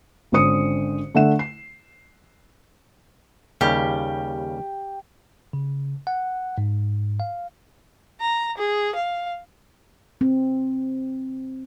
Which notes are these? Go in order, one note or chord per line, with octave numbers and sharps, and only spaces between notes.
G#1 D3 C#4 C5 D#6 C#7
D3 A3 E5 F#5 E7
C7
D#2 C#3 G3 G4
C#3
F#5
G#2
F5
A#5
G#4
F5
C4